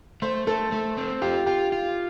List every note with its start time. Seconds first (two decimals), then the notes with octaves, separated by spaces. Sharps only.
0.22 A3 C5
0.47 A3 A4
0.72 A3
0.97 C4
1.22 F4 G4
1.46 F4 G4
1.72 F4